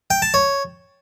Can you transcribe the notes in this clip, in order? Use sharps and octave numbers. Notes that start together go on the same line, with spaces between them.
G5
A5
C#5